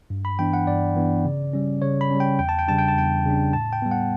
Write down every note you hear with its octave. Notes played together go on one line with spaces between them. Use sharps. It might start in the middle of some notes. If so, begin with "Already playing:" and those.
G2
B5
E3 B3 D4 G5
F#5
G2 D5
E3 B3 D4
C#3
G3 C#4
C#3 C#5
B5
G3 C#4
G5
E2 G5
A5
G5
C#3 G3 D4 A5
G5
A5
E2 G5
C#3 G3 D4
A2 A5
G5
G3 B3
F#5